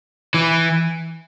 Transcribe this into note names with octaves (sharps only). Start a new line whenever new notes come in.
E3